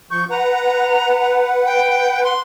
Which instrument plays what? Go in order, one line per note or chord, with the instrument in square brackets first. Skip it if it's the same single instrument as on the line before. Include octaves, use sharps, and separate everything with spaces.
[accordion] F3 C#6 [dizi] G6
[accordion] B4 F#5 [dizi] A#5
[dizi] G5
C6